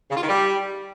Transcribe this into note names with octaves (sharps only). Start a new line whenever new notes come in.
C#3
F4
D#3
G3